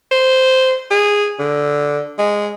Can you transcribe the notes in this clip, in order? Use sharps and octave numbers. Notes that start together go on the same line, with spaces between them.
C5
G#4
D3
G#3